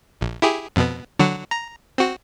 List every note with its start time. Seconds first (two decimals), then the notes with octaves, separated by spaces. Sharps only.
0.21 A#1
0.42 E4 G4 G#4
0.76 F2 B2 B3
1.19 D3 F#3 F#4
1.51 A#5
1.98 C4 F#4